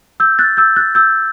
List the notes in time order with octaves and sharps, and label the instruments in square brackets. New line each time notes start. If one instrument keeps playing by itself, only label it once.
[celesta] E6 G6
F#6 A6
E6 G6
F#6 A6
E6 G6